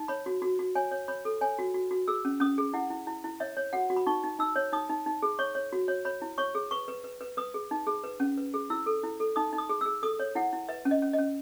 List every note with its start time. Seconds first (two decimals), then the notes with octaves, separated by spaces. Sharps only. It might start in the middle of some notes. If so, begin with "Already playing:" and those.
Already playing: D#4
0.08 C#5 B5
0.26 F#4
0.42 F#4
0.59 F#4
0.75 C#5 G#5
0.91 C#5
1.08 C#5 B5
1.25 A4
1.41 C#5 G#5
1.59 F#4
1.74 F#4
1.91 F#4
2.08 G#4 E6
2.25 C#4
2.40 C#4 D#6
2.58 G#4
2.73 E4 F#5
2.90 E4
3.07 E4
3.24 E4
3.40 C#5 E5
3.57 C#5
3.73 F#4 F#5
3.90 F#4
3.96 B5
4.07 D#4 C#6
4.23 D#4
4.39 D#4 E6
4.56 C#5
4.73 D#4 D#6
4.89 D#4
5.06 D#4
5.22 G#4
5.39 C#5 C#6
5.55 C#5
5.73 F#4
5.88 C#5
6.05 C#5 B5
6.22 E4
6.38 C#5 C#6
6.55 G#4
6.71 B4 C#6
6.88 B4
7.04 B4
7.21 B4
7.37 B4 D#6
7.54 G#4
7.71 D#4
7.87 G#4
8.04 B4
8.20 C#4
8.37 B4
8.54 G#4
8.70 E4 E6
8.86 A4
9.04 E4
9.20 A4
9.36 D#4 D#6
9.53 D#4
9.58 D#6
9.69 G#4
9.81 G#4 E6
10.03 A4 D#6
10.20 C#5
10.35 E4 F#5
10.53 E4
10.69 B4 E5
10.85 C#4
10.91 D#5
11.02 C#4
11.13 C#4 D#5